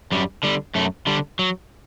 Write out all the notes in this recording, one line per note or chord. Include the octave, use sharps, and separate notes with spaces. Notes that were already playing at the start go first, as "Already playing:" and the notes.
F#2 G3
D3 G3
F#2 A3
D3 G3
F#3